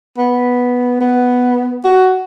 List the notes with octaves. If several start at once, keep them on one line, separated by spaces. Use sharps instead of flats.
B3
B3
F#4